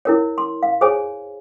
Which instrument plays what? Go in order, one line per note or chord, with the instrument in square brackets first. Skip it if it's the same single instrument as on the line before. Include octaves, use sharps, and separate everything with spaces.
[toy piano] E4 A#4 C#5
C6
F5
G#4 C5 C#5 G#5